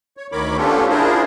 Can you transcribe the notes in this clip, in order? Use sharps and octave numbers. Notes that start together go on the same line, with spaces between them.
C#5
D2 D#3 A#4 C#5 B5 D6
B3 C#4 D4 F4 G4 A4
D4 E4 F4 G#4 A#4 C5